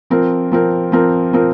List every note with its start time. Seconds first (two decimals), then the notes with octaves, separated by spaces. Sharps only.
0.10 F3 C4 A#4
0.52 F3 C4 A#4
0.92 F3 C4 A#4
1.33 F3 C4 A#4